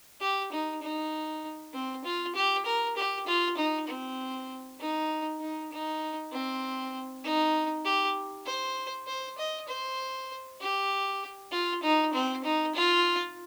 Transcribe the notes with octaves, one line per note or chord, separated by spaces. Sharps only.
G4
D#4
D#4
C4
F4
G4
A#4
G4
F4
D#4
C4
D#4
D#4
D#4
C4
D#4
G4
C5
C5
D#5
C5
G4
F4
D#4
C4
D#4
F4